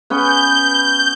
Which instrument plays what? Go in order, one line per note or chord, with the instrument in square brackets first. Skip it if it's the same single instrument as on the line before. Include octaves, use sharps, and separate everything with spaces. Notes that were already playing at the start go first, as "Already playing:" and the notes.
[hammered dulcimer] B3 C#4 B4 [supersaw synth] G6